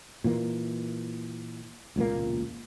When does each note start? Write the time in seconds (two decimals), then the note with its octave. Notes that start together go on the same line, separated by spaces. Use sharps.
0.24 A#2 E3 A#3
1.96 E1 C#2 A#2 A#3